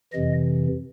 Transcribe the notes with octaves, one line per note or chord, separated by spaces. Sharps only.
F2 C3 E3 D#5